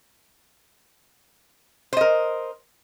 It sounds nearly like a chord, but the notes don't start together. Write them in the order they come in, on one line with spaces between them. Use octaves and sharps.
C5 D#5 A#4